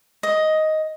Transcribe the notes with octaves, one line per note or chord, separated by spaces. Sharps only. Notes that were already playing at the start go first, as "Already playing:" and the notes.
D#5